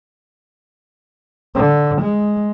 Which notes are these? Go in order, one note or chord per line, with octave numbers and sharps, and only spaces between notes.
D3
G#3